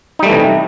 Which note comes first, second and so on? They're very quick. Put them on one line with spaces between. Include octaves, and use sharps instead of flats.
D#4 G3 A3 E3 C3